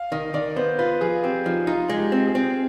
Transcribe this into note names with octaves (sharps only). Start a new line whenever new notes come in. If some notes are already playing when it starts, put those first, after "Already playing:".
Already playing: F5
D#3 D#5
D#3 D5
B3 C5
F4 B4
F3 G#4
C4 G4
F3 D#4
D#4 F4
G#3
G4
C4
G#4
C4